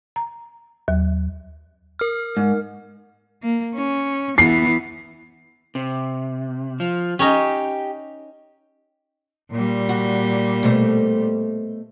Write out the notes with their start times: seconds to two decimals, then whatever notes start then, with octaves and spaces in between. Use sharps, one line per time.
0.16 A#5
0.88 D#2 F#3
1.99 A#4 F6
2.37 G#2
3.42 A#3
3.75 C#4
4.38 E3 B3 C7
5.75 C3
6.80 F3
7.19 C#4 D#4 G4
9.51 A#2 G3
9.89 F#4
10.63 B2 A3 C5